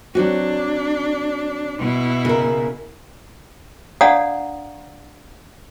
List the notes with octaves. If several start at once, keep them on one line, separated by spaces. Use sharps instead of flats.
F#3 C4 D4 F#4
B2 E4
C#3 A#4
D4 D5 F5 F#5 A#5 D#6